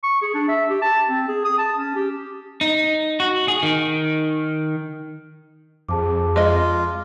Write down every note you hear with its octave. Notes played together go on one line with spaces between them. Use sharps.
C#6
G#4
D4
E5
G4
A5
C4
G#4
D#6
A5
C#4
G4
D#4
F#4
G#4
D#3
F2 G#4 A5 D6
G#3 F4 D#5